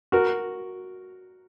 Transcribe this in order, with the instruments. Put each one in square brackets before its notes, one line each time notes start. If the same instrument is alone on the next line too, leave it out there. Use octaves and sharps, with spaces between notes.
[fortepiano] F#4 A#4